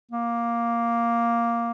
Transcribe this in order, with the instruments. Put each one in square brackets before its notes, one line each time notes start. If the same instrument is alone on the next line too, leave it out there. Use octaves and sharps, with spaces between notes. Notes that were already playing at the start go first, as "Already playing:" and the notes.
[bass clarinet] A#3